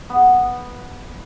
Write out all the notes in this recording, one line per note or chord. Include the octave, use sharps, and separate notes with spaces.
B3